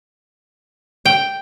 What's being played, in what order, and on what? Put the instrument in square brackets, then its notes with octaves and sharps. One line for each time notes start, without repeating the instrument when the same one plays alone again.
[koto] G5